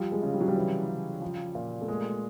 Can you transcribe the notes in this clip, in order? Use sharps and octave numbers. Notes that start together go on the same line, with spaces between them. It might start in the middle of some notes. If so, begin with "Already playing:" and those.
Already playing: F3 G3
G#3
C#3
G3
F#3
G3
E3
C#3
F3
A#2
A3
G#3 A#3